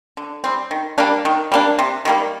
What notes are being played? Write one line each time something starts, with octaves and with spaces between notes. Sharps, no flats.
D3
G3 C4
D#3
G3 A#3 D4
D#3
G3 A#3 D4
C3
D#3 G3 A#3